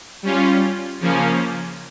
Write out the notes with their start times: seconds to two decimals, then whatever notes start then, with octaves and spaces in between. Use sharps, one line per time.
0.23 G3 C#4 F4
1.00 C#3 F3 A#3 C#4